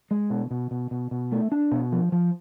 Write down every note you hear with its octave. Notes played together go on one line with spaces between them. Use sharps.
G#3
B2
B2
B2
B2
B2
A3
D4
B2
F3
F3